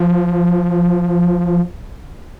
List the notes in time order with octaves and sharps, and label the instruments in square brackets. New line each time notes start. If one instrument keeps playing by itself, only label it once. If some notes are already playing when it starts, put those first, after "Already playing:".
Already playing: [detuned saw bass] F3